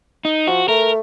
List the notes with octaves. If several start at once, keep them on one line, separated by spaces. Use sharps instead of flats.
D#4
F3 F#4
A3 A#4